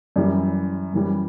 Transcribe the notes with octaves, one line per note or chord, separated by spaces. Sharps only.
F#2 E3 G3 D5
F#2 E3 G3